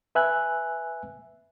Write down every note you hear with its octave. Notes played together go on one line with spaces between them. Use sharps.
B4 E5 G#5 F#6